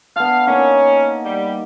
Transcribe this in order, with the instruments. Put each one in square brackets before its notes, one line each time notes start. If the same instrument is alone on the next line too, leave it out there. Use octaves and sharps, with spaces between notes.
[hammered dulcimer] B3 D4 [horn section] F5
[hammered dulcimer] A#3 D#4 [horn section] C#4
[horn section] G3